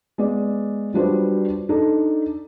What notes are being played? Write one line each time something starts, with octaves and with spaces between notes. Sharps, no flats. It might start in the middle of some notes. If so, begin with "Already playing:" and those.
G#3 B3 D5
F#3 G3 D4 F4 B4 C5
D4 D#4 A4 D5